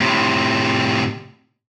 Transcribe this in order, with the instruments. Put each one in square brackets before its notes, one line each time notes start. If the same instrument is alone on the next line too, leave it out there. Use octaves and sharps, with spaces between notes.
[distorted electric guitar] A2 C3